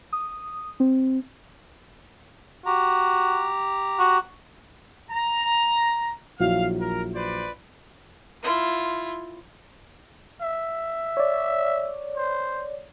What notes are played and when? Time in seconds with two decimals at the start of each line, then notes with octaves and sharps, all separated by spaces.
0.13 D#6
0.80 C4
2.66 F#4 G4 A#5
3.99 F#4
5.11 A#5
6.40 A#1 F#3 E4 F5
6.80 A#4
7.15 B4 C5 D5
8.43 E4 F4
10.41 E5
11.17 C#5 D5
12.17 C5